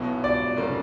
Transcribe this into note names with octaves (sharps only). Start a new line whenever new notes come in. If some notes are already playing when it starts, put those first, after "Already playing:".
Already playing: B1 B2 F#3 B3 E4
D5
F1 C#3 F#3 A#3